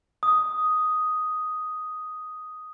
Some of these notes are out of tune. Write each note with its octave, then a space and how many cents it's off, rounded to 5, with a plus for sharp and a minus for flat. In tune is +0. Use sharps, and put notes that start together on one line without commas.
D#6 +5